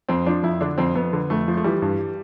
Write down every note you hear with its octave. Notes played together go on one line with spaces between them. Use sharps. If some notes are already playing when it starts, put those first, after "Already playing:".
F2 C4
F3 D4
F2 E4
D3 D4
F2 C4
F2 B3
D3
F2 A3
F3
A3
E3 G3
G2